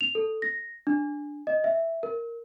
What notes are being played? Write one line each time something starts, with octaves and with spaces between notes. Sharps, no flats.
F7
A4
A#6
D4
D#5
E5
A#4